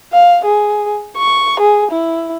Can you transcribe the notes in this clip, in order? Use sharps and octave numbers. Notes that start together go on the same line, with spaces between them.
F5
G#4
C#6
G#4
E4